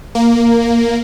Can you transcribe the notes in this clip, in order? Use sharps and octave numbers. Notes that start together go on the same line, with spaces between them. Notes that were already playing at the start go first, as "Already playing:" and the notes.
A#3